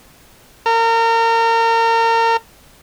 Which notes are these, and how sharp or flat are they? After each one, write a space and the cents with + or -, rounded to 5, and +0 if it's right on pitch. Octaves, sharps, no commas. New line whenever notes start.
A#4 -30